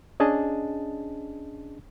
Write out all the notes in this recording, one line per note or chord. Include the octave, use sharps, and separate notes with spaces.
C#4 D4 G#4 D#5 A5